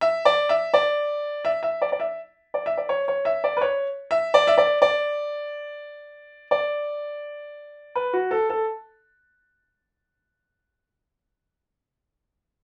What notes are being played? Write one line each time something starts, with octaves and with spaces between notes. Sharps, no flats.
E5
D5
E5
D5
E5
E5
D5
D5
E5
D5
E5
D5
C#5
C#5
E5
D5
B4
C#5
E5
D5
E5
D5
D5
D5
B4
F#4
A4
A4